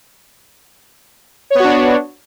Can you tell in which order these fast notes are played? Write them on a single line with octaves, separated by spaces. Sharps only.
C#5 B3 F#4 D4